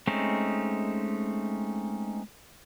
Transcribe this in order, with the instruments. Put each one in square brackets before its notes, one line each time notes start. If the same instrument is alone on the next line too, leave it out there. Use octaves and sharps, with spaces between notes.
[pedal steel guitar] G#3 A3 C4 C#4 D#4